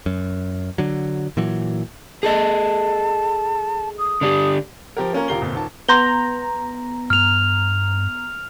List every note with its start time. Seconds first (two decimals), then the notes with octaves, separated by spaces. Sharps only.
0.06 F#2
0.78 D3 F#3
1.37 A#2 E3 F#3
2.23 G#4 A4 D#5 A5
3.99 D#6
4.21 D3 D4 G4
4.97 F3 G4 A#4
5.13 A#3 C#4 F4 A#4
5.28 D#1 F4 G4 A#4 C7 G7
5.41 G1 F2 A#2
5.53 D#1 D#3 A5
5.88 B3 A#5 C6 G6 G7
7.10 G2 F6 F7